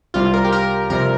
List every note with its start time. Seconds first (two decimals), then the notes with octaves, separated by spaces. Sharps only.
0.14 C2 C3 G3 F4
0.33 A#4
0.45 G4
0.52 A#4
0.90 F2 C3 G3 A#4